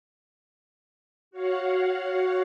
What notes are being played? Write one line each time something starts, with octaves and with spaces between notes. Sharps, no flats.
F#4 C#5 F5 F#5